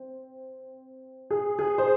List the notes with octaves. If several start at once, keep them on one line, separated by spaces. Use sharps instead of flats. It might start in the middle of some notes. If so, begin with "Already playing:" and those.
Already playing: C4
G#4
G#4
C5